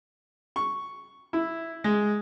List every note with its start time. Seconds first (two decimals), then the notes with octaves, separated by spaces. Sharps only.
0.56 C#6
1.33 E4
1.84 G#3